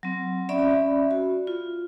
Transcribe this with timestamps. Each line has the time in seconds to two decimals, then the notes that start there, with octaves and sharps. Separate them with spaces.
0.03 F#3 C4
0.49 C#4 D5 E5 B5
1.11 F#4
1.47 F4